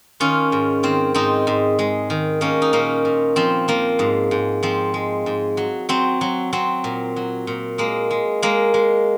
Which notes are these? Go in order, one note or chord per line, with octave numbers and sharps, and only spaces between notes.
D#3 C#4 F4
G#2
D#3 C4
G#2 C4 D#4
G#2
G#3
D#3
D#3 A#3 C#4
D#4
A#2 A#3 C#4
A#2
F3 C4
F3 A#3
G#2
G#2
F3 C4
G#3
G#2
F#3
F#3 C4
F#3
F#3 C4
A#2
F#3
A#2
G#3 A#3
G#3
G#3 A#3
G#3